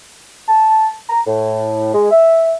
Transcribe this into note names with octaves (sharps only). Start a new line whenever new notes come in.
A5
A#5
A2
G#3
E5